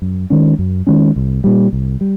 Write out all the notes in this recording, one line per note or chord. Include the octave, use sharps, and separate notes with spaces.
F#2
D#3 G#3 C#4
F#2
D#3 G#3 C#4
C2
A#2 G3
C2
G3